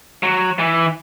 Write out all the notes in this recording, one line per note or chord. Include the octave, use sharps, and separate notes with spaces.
F#3
E3